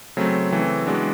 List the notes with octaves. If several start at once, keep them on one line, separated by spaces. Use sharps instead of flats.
C#3 F#3 A3 C4
C#3 E3 A3 C4
E3 G#3 B3 D4 F#4